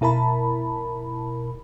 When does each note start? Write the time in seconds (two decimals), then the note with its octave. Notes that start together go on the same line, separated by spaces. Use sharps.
0.01 B2 E4 A#4 A5 B5